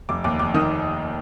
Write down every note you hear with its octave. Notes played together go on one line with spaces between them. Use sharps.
F1 D6
D#2 D6
F1 D6
D#3 D#6